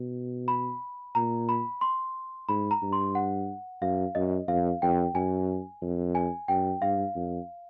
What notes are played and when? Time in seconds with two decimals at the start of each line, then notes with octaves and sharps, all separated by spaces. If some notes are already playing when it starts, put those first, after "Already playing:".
Already playing: B2
0.48 B5
1.15 A#2 A#5
1.49 B5
1.81 C6
2.49 G#2 B5
2.71 A#5
2.82 G2
2.93 C6
3.15 F#5
3.82 F#2 F5
4.15 F#2 D#5
4.48 F2 F5
4.82 F2 G5
5.15 F#2 G#5
5.82 F2
6.15 G#5
6.48 F#2 G5
6.82 G2 F5
7.16 F2